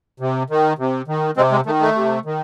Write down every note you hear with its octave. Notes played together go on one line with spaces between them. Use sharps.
C3
D#3
C3
D#3
C3 G#3 C4
G#3
D#3 A3
A3
C3
D#3